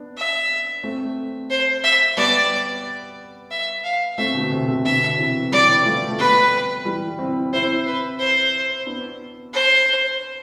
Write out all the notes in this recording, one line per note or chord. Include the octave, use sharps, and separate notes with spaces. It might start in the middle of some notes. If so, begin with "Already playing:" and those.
Already playing: B3 D4
E5
A3 C4
C5
E5
G3 B3 D5
E5
F5
A3 C4 E5
B2 D3
C3
C3
B2 D3 E5
C3 E3
E3 G3 D5
F3 A3
A3
G3 B3 B4
E3 G3
C4 E4
C4 E4 C5
B4
C5
B3 D4
C5